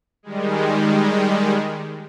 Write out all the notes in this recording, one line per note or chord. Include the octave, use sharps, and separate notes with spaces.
D#3 G3 G#3